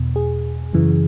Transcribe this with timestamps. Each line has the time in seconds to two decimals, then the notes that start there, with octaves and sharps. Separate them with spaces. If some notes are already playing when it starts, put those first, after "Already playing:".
Already playing: E2 B2
0.16 G#4
0.73 F#2 C#3 E3